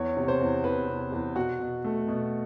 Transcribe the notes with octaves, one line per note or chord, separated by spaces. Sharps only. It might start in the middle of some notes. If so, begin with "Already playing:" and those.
Already playing: E2 C#5
C3
C#5
C5
E2
E2 B4
C3
E2
B2 F#4
B2
A3
B2